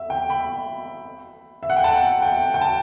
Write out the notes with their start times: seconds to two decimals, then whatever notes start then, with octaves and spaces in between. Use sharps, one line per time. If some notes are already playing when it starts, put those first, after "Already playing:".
Already playing: E5
0.10 G5
0.30 B5
1.63 E5
1.70 F#5
1.77 G5
1.84 A5
2.22 G5
2.54 G5
2.61 A5